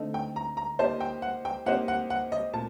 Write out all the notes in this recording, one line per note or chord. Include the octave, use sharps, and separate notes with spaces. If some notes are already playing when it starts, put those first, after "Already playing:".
Already playing: D3 A3 C4 D#4 A4
G5
A#5
A#5
A#3 D#4 G4 C5 D#5 A5
G5
F#5
G5
A#3 D#4 G4 C5 D#5 F#5
F#5
F#5
D#5
A#2 A5